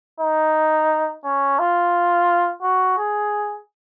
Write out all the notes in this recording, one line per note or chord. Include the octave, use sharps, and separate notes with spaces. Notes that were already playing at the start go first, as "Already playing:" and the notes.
D#4
C#4
F4
F#4
G#4